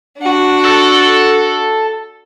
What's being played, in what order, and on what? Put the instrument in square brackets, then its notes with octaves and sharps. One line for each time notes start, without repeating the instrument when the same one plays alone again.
[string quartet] D4 F#4
[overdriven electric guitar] A4